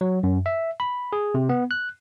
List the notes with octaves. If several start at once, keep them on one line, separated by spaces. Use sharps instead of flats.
F#3
F#2
E5
B5
G#4
C3
B3
F#6